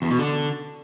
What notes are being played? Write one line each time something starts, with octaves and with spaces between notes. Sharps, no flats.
E2
B2
D3